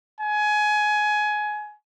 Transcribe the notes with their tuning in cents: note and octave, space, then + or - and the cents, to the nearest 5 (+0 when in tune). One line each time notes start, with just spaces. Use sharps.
G#5 +20